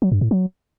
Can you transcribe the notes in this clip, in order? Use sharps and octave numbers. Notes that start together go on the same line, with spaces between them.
F#3
G2
A2
F#3